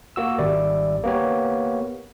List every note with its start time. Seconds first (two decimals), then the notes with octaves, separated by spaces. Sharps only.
0.16 A#3 F#4 E6
0.38 G#1 G3 D5 E5
1.04 A#3 B3 G4 C#5